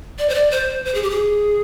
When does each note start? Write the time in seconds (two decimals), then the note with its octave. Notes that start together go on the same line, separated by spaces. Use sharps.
0.18 D5
0.29 C5
0.34 D5
0.51 C5
0.85 C5
0.94 G#4
1.03 G4
1.10 G#4